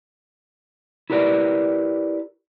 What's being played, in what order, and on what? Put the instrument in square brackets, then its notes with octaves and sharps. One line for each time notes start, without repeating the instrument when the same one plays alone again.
[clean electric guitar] E4 G4 A#4 B4 D5